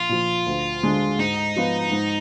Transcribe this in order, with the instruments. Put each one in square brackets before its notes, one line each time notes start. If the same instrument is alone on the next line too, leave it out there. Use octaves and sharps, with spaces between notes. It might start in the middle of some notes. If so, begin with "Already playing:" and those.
Already playing: [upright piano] A#1 [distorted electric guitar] F4
[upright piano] A#2 F3
D2
D3 G#3 D4
[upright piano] G#2 [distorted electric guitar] D#4
[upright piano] F3 B3 F4
G#2